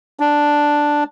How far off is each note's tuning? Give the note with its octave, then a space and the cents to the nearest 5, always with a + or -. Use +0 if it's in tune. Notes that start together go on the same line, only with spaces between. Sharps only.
D4 +0